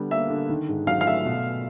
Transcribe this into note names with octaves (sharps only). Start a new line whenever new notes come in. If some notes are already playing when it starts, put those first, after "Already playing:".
Already playing: D3 G3 B3
A#3 E5
D3
D#3
G#2
F#3 F5
F5
A3 E5
B2